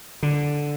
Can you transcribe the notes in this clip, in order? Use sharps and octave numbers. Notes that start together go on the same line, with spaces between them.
D3